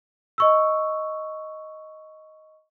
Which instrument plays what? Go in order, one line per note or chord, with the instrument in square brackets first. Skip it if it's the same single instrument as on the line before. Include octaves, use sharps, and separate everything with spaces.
[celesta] D#5 C#6 E6